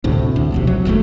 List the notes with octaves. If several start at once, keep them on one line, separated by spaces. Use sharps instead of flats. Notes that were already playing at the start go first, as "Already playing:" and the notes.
D2 A2 C3
D2
F1 B1 C3
F#3
F#1 E2 C#3 A3